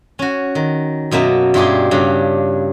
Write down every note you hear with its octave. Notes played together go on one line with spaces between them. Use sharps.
C#4 F#4
D#3
F#2 B2 A#3 E5 A5
G2 E4 F4 G4 G#4
G2 C#3 D4